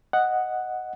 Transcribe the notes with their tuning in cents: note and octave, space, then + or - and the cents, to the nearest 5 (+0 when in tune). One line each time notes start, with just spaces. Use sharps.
D#5 +0 F#5 +0